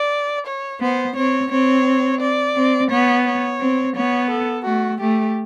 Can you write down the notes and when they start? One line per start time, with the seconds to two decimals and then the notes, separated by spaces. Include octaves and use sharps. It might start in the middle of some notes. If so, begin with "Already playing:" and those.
Already playing: D5
0.46 C#5
0.81 B3 C5
1.16 C4 C#5
1.51 C4 C#5
2.21 D5
2.56 C4
2.90 B3 C#5
3.26 C#5
3.60 C4
3.96 B3 C#5
4.31 A4
4.65 A3 F#4
5.00 A3 G4